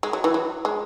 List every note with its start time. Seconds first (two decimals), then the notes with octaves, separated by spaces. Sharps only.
0.03 G#3
0.13 F#3
0.24 E3
0.34 F#3
0.65 G#3